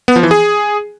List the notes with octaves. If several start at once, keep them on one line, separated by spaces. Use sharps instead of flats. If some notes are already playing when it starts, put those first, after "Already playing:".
B3
F3
E3
G#4